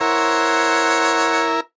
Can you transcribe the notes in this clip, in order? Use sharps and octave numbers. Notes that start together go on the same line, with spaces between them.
E4 A#4 C5 C#5 F#5